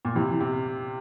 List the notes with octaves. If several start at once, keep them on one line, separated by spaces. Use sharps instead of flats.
A#2
C3 E3
C3